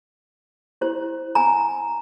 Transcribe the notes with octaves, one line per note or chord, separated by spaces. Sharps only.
E4 G4 C5
G#5 A#5